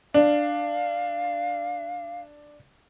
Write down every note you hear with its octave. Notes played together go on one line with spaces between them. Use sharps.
D4 F5